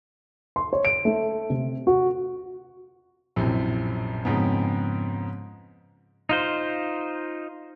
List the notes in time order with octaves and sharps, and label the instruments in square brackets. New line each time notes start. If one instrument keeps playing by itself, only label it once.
[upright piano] C6
C#5
D7
A3
C3
F#4
[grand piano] A#1 F#2 A2 C3
F2 G#2 C#3 B3
[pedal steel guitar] D#4 F4 C5